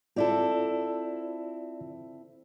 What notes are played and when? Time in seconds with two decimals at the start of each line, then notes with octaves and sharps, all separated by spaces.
0.16 C4 E4 F4 A4 D5